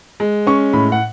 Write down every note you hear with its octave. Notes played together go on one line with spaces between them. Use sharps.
G#3
C#4 C#6
A2 B5
F#5